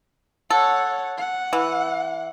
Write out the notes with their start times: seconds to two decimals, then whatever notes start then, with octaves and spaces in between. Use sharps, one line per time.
0.50 A4 C#5 F#5
1.17 F#5
1.53 E3